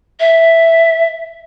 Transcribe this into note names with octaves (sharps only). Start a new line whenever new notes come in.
E5